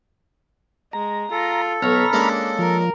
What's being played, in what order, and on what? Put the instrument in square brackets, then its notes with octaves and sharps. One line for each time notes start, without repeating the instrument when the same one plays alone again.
[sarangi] G#3 [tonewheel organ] A#5
[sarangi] F4 [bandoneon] A4
[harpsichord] B1 [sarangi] C#5 [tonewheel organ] A#5 B5 F6
[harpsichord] G#3 A#3 C#4 [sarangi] D4
[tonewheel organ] F3 [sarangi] A#4